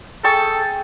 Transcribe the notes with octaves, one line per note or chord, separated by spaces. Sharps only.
G#4 A4 G5 C#6